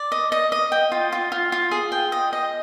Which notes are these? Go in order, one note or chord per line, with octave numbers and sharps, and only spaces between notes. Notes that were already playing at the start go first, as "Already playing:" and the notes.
Already playing: D5
D#5
D#5
D#5
G5
F4
F4
F4
F4
G#4
G5
D#5
D#5